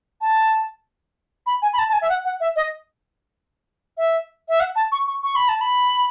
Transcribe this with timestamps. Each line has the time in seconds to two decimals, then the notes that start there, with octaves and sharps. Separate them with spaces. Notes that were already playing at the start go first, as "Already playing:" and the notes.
0.21 A5
1.46 B5
1.62 G#5
1.73 B5
1.78 A5
1.89 A5
1.93 G#5
2.01 E5
2.09 F#5
2.24 F#5
2.40 E5
2.56 D#5
3.97 E5
4.49 E5
4.60 F#5
4.76 A5
4.92 C#6
5.07 C#6
5.23 C#6
5.36 B5
5.48 A5
5.61 B5